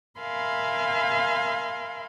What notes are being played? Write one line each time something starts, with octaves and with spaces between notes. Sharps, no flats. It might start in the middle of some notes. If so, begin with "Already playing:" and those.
A#4 E5 F5 G#5 B5 C6